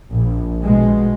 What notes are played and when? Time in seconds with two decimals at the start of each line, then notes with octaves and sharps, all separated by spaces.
0.11 A#1
0.63 B2 G#3